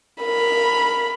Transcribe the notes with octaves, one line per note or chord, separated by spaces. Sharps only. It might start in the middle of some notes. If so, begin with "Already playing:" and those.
A#4 B5